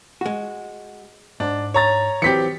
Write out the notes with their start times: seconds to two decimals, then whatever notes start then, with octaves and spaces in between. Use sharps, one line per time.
0.21 G#3 F#4
1.40 G#2 D4
1.74 C#5 A#5 A6
2.22 E3 F#3 C4 G4 B6 C#7